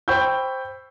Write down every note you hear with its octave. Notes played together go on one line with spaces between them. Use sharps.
C5 G5 B5 C#6 E6 G6